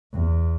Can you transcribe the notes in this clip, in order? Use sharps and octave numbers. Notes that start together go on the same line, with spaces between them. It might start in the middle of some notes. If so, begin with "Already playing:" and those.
E2